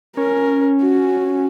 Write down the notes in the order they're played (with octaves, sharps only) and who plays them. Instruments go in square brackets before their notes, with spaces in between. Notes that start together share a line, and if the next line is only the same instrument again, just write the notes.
[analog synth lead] C#4 [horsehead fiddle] A#4
[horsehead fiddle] F#4